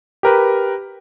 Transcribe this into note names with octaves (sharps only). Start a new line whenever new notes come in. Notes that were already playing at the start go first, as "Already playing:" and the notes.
G4 A#4 B4